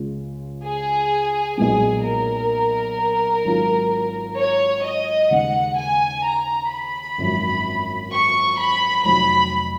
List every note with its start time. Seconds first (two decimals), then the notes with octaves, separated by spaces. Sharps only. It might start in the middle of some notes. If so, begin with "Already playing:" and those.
Already playing: C#2 C#3 G#3 C#4 F4
0.65 G#4
1.58 B1 A#2 G#3 B3 G#4
2.04 A#4
3.45 G#1 G#2 F#3 C#4 F4
4.38 C#5
4.84 D#5
5.31 D#2 C#3 G#3 D#4 F#5
5.78 G#5
6.25 A#5
6.71 B5
7.18 G#1 F#2 F3
8.12 C#6
8.58 B5
9.04 F1 F2 D#3 F#3 B5